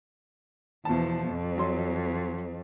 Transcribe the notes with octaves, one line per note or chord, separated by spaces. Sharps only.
E2 B2 F3 A5
F2
F#3 C6